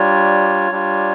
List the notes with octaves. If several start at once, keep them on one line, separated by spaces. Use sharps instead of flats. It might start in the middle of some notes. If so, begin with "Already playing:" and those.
Already playing: G3 D4 F4 C#5
G3 D4 F4